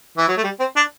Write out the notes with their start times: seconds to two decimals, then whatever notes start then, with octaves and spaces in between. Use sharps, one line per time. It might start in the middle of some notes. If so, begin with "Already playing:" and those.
0.18 E3
0.28 F#3
0.37 A3
0.44 G3
0.60 C4
0.76 D4